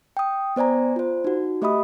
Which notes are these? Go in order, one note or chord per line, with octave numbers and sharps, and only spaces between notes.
G5 D#6
B3 C5 D5 G#5 A#5
F4 C5
D#4 F#4
A3 G4 D#5 E5 B5 D#6